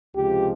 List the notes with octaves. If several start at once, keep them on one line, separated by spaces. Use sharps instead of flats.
C#2 C3 F3 G#3 G4